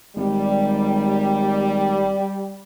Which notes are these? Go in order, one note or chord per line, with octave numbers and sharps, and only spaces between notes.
G#1 G3